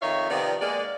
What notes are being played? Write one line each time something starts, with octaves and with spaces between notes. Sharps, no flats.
F2 D#3 D#4 C#5 E5 F5
C3 D#3 F3 B3 D5
G#3 A#3 D5